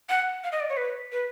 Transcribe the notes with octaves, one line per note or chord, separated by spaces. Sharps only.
F#5
F5
D#5
D5
C#5
B4
B4